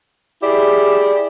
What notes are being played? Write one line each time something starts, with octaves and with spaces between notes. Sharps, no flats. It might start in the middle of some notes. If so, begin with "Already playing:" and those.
E4 G4 G#4 D5